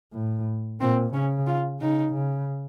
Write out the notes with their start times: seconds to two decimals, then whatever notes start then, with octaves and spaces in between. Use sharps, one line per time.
0.13 A2
0.81 A#2 C4
1.13 C#3 C#4
1.47 F4
1.80 C#3 D#4
2.13 C#3